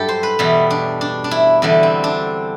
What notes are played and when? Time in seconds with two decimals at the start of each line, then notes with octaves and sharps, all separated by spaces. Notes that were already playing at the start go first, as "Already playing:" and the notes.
Already playing: G2 F#3 E4 G4 A4
0.09 C5
0.23 B4
0.39 E2 B2 G3 E4
0.70 D4
1.01 D4
1.24 D4
1.31 E4
1.62 E2 D3 G3 E4
1.83 C4
2.04 D4